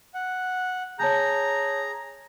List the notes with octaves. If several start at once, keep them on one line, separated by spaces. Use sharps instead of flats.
F#5
G#4 C#5 A5 A#5 G6